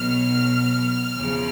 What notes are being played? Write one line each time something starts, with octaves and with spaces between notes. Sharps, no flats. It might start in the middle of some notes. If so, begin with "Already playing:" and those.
Already playing: B1 B2 F#3 F6
E2 C#3 F3 F6